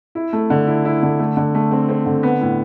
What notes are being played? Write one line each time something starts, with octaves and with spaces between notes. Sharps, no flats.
E4
A3
D3
E4
E4
D3
A3
D3
A3
C4
C4
D3
B3
A2